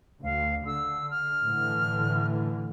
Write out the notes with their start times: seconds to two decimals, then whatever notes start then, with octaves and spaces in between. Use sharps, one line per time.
0.23 D2 F5
0.66 D3 E6
1.10 F6
1.43 A2 D3 E3